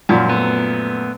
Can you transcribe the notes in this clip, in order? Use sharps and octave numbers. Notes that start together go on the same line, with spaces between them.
F#2 A#2 F3
A3 B3